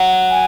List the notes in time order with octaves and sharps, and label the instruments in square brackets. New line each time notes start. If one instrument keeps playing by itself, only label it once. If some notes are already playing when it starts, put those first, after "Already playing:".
Already playing: [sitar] F#3
[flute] G#5